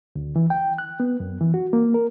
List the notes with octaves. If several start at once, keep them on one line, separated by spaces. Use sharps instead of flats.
D2
E3
G5
F#6
B3
F#2
E3
F#4
A#3
A#4